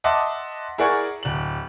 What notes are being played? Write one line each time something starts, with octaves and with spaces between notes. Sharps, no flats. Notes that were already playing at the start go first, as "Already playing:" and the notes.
D#5 E5 F#5 A5 C6 D6
E4 G#4 A#4 D5 F#5 C#6
D1 F#7